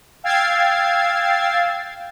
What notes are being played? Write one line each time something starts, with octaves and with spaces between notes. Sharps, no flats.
F5 G5 E6 G#6 A6 C7